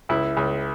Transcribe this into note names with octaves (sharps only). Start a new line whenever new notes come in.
C#2 E4
C#2